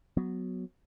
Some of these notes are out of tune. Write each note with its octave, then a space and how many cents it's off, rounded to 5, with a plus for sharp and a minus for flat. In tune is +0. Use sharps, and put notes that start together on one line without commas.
F#3 +0 B3 +0